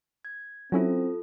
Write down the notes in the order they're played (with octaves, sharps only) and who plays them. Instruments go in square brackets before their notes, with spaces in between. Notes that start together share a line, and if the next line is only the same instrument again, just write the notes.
[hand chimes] G#6
[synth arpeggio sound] F#3 C#4 E4 [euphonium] C4 [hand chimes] F4 A4